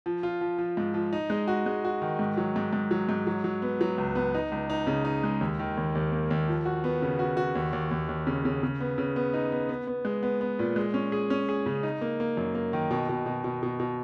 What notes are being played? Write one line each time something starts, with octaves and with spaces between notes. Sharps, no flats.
F3
F4
F3
F3
G#2
F3
D#4
G#3
F#4
G#3
F#4
D#3
G#2
F#3
G#2
G#2
F#3
G#2
F#3
F#3
B3
F#3
C#2
B3
D#4
C#2
D#4
C#3
D#4
G#3
D#2
D#3
D#2
D#2
A#3
D#2
F3
F#4
B3
C#3
F#4
F#4
D#2
D#2
D#2
D#2
C#3
C#3
C#3
B3
C#3
B3
D#4
B3
B3
B3
G#3
B3
B3
A#2
G#3
C#4
G#4
C#4
G#4
C#3
D#4
A#3
A#3
F#2
A#3
D#3
B2
B2
B2
B2
B2
B2